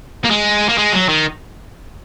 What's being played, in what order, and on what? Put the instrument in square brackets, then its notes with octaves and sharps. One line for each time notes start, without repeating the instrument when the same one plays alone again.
[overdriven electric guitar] A#3
G#3
A#3
G#3
F#3
D#3